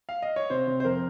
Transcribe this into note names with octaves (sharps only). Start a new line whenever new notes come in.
F5
D#5
C#5
C3 C5
C3
C5
F2 A#4